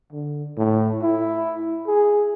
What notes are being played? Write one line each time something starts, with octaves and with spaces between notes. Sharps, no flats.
D3
A2
E4
G#4